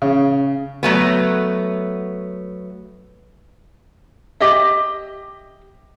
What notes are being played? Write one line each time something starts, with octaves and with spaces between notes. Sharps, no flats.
C#3
F#3 A3 B3
G4 D#5 E5